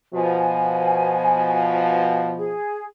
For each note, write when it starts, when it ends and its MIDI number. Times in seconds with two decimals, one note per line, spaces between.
0.14 2.58 47
0.14 2.58 53
0.14 2.17 80
2.37 2.84 68